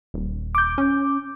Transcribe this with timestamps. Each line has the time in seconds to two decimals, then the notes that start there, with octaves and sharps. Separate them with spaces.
0.14 D#1
0.55 D6 G6
0.78 C#4